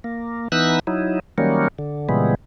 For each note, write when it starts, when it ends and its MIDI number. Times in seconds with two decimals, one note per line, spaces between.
0.04 0.48 58
0.52 0.79 52
0.52 0.79 59
0.52 0.79 63
0.52 0.79 88
0.52 0.79 90
0.87 1.19 54
0.87 1.19 63
0.87 1.19 64
1.38 1.68 51
1.38 1.68 54
1.38 1.68 55
1.38 1.68 58
1.38 1.68 61
1.79 2.08 50
2.09 2.35 46
2.09 2.35 49
2.09 2.35 52
2.09 2.35 55
2.09 2.35 56
2.09 2.35 59